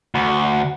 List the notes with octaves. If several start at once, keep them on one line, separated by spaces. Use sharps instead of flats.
D2